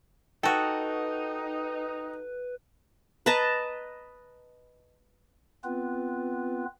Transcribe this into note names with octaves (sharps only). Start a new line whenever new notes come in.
D#4 F#4 A4 B4 G5
B4 D#5 A5 A#5
B3 C4 F4 B4